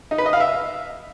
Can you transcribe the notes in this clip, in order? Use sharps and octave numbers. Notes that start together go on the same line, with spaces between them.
D#4
B4
D#5
F5
E5